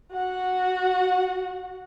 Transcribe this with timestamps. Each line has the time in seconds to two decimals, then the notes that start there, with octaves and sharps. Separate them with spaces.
0.12 F#4 F#5